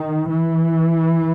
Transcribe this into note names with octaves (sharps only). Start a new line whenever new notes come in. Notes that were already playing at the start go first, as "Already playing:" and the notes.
Already playing: D#3
E3